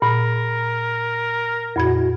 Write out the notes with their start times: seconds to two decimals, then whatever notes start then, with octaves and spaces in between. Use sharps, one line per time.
0.02 A#2 A#4
1.76 F2 A#2 E4 F#4 G#6